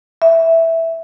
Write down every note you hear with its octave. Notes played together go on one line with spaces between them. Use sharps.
E5